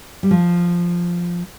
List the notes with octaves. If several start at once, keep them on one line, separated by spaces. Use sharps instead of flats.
G3
F3